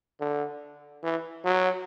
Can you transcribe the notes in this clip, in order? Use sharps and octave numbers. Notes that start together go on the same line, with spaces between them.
D3
E3
F#3